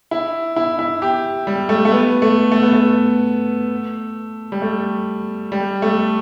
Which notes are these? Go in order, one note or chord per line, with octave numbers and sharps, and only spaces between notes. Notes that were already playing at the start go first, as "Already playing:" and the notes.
E4
E4
E4
G4
G3
A3
A3
B3
A3
A3
B3
A3
G3
A3
G3
A3